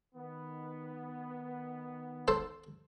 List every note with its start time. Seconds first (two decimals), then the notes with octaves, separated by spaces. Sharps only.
0.15 D#3 B3
2.28 A4 C5 A5